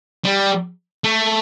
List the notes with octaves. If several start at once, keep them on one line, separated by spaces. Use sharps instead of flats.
G3
A3